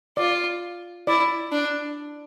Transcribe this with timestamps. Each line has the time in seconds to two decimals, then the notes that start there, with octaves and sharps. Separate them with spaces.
0.17 F4 D5
1.07 E4 D5
1.52 D4